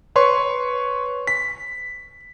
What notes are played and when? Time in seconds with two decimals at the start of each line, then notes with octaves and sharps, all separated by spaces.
0.16 B4 C#5 C6 C#6
1.27 B6